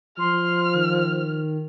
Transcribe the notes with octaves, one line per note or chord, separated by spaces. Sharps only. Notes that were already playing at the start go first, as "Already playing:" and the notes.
F3 C6 F6
D#3